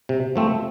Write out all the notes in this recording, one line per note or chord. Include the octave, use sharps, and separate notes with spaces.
C3
F3 A3 C4